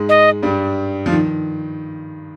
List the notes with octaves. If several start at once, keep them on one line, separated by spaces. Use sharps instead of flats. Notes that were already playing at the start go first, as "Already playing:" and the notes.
Already playing: G#2 G#3
D#5
G2 G3
F3
D#3